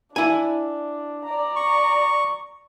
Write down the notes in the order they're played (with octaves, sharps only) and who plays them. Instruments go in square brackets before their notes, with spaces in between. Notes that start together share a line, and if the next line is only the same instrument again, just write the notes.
[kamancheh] D4 [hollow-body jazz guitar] E4 G#5
[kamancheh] D5 A#5
[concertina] C#6